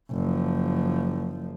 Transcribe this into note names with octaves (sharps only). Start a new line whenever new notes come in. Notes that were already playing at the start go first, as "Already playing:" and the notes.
F#1 F3